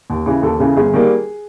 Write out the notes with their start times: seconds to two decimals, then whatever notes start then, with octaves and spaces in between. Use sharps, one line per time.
0.10 D#2
0.26 C#3 E3
0.43 D#2 A4
0.60 C#3 E3
0.76 G1 G#4
0.93 D#3 G3 A#3